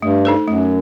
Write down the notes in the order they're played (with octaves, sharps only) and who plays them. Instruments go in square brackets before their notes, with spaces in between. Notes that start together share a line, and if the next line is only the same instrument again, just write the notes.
[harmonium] G2 [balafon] A3
[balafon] D#4 A4 C5
[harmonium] F#2 [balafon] A3